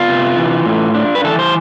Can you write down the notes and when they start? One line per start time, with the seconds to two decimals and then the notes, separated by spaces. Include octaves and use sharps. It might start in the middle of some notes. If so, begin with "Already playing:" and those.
Already playing: B3 F4
0.08 C3
0.36 E3
0.66 A2
0.95 D4
1.15 B4
1.24 E3 A4
1.39 C5